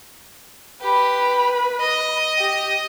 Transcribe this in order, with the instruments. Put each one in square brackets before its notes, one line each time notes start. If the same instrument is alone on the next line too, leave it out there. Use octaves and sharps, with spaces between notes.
[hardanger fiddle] G4 [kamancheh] B4 B5
[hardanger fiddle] D#5
[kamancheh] G4